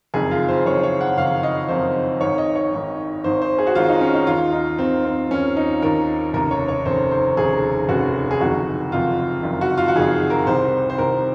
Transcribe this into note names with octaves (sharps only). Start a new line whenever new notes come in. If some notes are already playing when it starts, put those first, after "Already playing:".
F#1 F2 D#3 G#4
F4
C5
F#1 F2 D#3 C#5
C#5
F#5
F#1 F2 D#3 F5
D#5
F#1 F2 D#3 C5
G#1 G#2 D#3 C#5
D#5
C#5
G#1 G#2 D#3
G#1 G#2 D#3 C5
C5
G#4
F#4
G#1 G#2 D#3 F4
D#4
C#4
D#4
D#2 D#3 F4
D#4
D#2 D#3 C4
C4
D#2 D#3 C#4
D#4
D#2 D#3 A#4
F1 D#2 C#3 A#4
C#5
C#5
F1 D#2 C#3 C5
C5
F1 D#2 C#3 G#4
F1 D#2 C#3 F#4
G#4
F#1 F2 D#3 F#4
F#1 F2 D#3 F4
F#1 F2 D#3
F#4
F4
F#4
F#1 F2 D#3 G#4
A#4
C2 C3 D#3 C5
C5
C2 C3 D#3 A#4